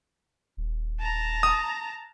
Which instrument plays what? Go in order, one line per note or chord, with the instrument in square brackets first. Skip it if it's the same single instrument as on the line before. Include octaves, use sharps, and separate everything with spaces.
[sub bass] D#1
[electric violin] A5 A#5
[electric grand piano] D#6